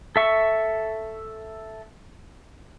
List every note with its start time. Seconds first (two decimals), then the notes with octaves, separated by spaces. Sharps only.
0.16 A4 E5 C#6